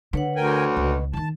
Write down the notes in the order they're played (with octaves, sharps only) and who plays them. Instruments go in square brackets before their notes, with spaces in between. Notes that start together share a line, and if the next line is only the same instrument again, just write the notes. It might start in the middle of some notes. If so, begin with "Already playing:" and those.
[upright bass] D3 [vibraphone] B4 C#5 F#5
[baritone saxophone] D2 [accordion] A#4 G5 G#5
[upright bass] C#2 [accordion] B2
[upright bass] D3 D#3 [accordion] A5